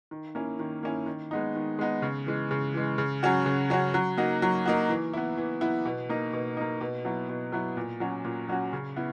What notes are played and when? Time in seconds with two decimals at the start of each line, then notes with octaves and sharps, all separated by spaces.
0.11 D#3
0.35 A#3 C#4 E4
0.59 D#3
0.83 A#3 C#4 E4
1.06 D#3
1.31 G#3 B3 D#4
1.55 D#3
1.79 G#3 B3 D#4
2.02 C#3
2.26 E3 G#3
2.51 C#3
2.74 E3 G#3
2.98 C#3
3.23 F#3 C#4 F#4
3.46 C#3
3.70 F#3 C#4 F#4
3.94 F#3
4.18 A#3 D#4 F#4
4.42 F#3
4.66 A#3 D#4 F#4
4.89 E3
5.13 B3 E4
5.38 E3
5.61 B3 E4
5.85 B2
6.09 A#3 D#4
6.33 B2
6.57 A#3 D#4
6.81 B2
7.05 F#3 B3 E4
7.29 B2
7.52 F#3 B3 E4
7.77 A#2
8.00 F#3 C#4 F#4
8.25 A#2
8.49 F#3 C#4 F#4
8.73 C#3
8.96 B3 E4